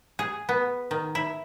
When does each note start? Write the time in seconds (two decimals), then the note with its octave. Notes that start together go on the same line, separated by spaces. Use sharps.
0.19 G#4
0.49 B3
0.91 D#3
1.15 E4